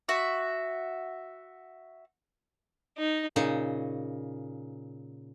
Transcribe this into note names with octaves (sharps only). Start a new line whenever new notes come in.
F#4 E5
D#4
A#2 C#3 D#4